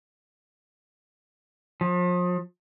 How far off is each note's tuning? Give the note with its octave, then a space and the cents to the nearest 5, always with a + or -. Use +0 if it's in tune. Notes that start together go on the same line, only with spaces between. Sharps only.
F3 +35